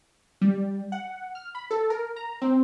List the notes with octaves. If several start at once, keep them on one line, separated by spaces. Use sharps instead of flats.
G3
F#5
F6
B5
A4
A#4
A#5
C4